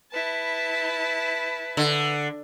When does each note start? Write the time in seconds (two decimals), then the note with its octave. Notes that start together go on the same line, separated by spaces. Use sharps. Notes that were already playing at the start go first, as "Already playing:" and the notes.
0.12 E4 B4 A5
1.77 D3